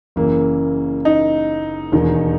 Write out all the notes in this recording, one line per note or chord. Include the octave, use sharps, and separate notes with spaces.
F#1 F#2 C#3 E3 A#3
D#4
E1 D#2 D#3